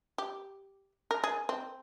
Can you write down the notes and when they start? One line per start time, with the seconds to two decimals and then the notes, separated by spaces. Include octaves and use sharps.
0.18 G4
1.11 A#4
1.24 G#4
1.49 C4